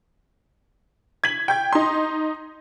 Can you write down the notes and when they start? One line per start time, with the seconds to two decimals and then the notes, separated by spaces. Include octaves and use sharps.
1.24 G#6 B6 F#7
1.48 G5 G6 G#6
1.73 D#4 C6